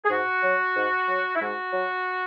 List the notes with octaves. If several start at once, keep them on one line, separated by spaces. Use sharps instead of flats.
G#4
G#2 F#4
F#3
G#2
F#3
E4
G#2 F#4
F#3